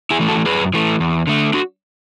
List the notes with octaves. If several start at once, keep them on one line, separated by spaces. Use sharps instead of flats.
E4 G#4
E3 A3
F#4 A4
F#2 G#4 B4
E3 A3
E2
D3 A3
D4 F#4